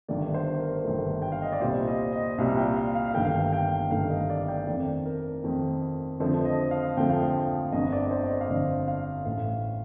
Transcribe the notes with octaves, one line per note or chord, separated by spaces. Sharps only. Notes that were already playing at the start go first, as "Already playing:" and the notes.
G1 G2 D#3 A3 D5
C5
A#4
G1 G2 D#3 A3
G5
F5
D#5
D5
C2 A#2 G3 C5
D#5
D#5
C2 A#2 G3 F5
G5
F5
F5
G1 G2 D#3 A3 G5
F5
G5
G5
G1 G2 D#3 A3 F5
D#5
D5
G5
F2 D#3 A3 D5
A#4
F2 D#3 A3
F2 D3 F3 A3 C5
D#5
F5
F2 D3 F3 A3 G5
F5
G5
F5
G1 F2 D3 D#5
D5
C5
D#5
D5
F5
G1 F2 D3 D#5
F5
A1 A2 A3 F5